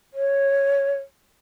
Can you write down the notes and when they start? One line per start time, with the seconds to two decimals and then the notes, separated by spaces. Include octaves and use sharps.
0.14 C#5